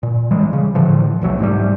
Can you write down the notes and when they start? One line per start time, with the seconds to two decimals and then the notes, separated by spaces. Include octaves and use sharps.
0.03 A#2
0.31 D#1 E3 G3 G#3
0.53 C#3
0.75 A2 D3 E3 F3
1.21 E1 B1 F#3 A3
1.39 G#2 C3 F3 G3